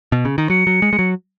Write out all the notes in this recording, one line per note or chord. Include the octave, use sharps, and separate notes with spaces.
B2
C#3
D#3
F#3 C#7
F#3
G#3
G#3
F#3